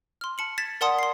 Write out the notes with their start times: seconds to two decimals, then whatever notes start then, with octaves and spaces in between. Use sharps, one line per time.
0.21 C6 F6
0.38 A5 C#7 F#7
0.58 G#6 A6 B6 E7
0.81 A#4 D5 F#5 A5 C6 D#6
0.99 C6 C7